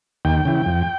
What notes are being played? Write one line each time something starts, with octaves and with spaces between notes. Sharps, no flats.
D#2 G5
C#3 E3
F2